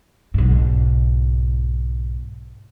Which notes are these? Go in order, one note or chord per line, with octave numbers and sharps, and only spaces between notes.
B1 G#2